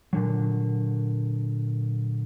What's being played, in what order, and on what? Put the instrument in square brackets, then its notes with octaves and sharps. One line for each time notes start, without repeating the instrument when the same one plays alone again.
[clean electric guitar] A#2 D3 F#3